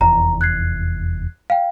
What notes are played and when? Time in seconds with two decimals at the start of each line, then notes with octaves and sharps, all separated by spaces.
0.01 F1 E2 A#5
0.41 F#6 G#6 C7
1.50 F5 G5